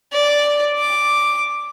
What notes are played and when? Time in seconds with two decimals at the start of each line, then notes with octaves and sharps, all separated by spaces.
0.13 D5
0.78 D6